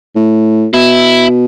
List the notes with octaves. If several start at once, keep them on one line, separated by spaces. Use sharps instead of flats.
A2
B2 E4